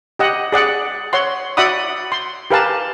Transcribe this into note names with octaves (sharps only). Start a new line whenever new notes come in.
G4 D#5 F#5
G#4 D5 F#5
C#5 F#5 C6
F#4 D5 E5 F#5 B5 D#6
C6
G4 A#4 B4 F5 G#5 A5